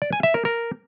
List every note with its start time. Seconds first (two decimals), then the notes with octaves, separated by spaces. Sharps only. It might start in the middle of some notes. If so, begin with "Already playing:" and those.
0.02 D5
0.13 G#5
0.23 E5
0.34 A#4
0.45 A#4